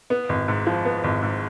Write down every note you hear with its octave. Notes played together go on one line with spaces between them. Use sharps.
B3
G#1
G#2
F3
B3
G#1
G#2